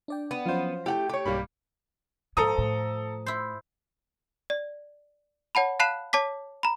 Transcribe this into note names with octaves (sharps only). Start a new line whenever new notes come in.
D4 D5 G5
B3
F3 F#3 C#4 F4 C5
A3 E4 G4 F#5 G5
G4 C#5 D6
B1 G2 G3 A#3 B5
G#2 F3 A4 A#5 D#6
A2
E4 C5
D5
C#5 F#5 A5 B5
F5 A5 B5 F#6 C7 E7
C#5 A5 D6 B6
A#5 B5